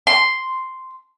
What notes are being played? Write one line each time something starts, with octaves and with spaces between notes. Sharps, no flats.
C6